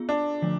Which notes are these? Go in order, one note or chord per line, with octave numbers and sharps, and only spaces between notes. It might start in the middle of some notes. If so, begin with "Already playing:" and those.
Already playing: B3 F4 G#4
D4
D3 F3 A3